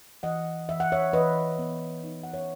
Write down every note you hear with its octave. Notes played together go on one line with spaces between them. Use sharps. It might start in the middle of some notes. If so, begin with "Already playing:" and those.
E3 D#5 F#5
E3 E5
F#5
C#5 E5
E3 B4 D#5
B3
D#4
F#5
C#5 E5